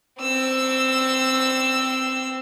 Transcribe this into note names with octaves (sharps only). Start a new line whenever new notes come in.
C4 E6